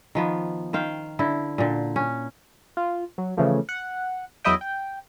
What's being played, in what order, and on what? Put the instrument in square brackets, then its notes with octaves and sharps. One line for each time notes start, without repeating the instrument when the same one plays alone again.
[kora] D#3 F3 B3
D#3 C5 F5 G5
D3 E4
A#2 D3
C#4
[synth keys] F4
F#3
C#3 E3 F3 A3
F#5
E2 F#3 E4 D#5 E5 G5
G5